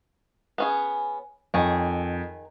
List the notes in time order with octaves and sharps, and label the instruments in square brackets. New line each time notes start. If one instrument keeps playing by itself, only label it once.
[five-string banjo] B3 C#4 G#4
[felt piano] F2 [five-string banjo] D#3 G#4 C#5